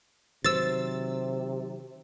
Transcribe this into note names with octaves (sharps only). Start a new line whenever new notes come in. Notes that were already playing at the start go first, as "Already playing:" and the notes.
C3 D#3 F#3 C5 E6 A6